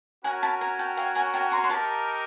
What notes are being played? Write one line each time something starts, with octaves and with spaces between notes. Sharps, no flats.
C#4 F#4 A#4 C#5 F#5 G#5
A5 B5
G#5 A#5
G5 A5
F5 G5
F#5 G#5
G5 A5
A#5 C6
C6
D#4 G4 A#4 A5 B5